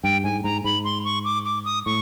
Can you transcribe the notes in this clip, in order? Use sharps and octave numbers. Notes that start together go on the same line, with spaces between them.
G2 G5
G#2 G#5
G#2 A#5
G#2 B5
C6
C#6
D6
D6
D#6
A2 C#6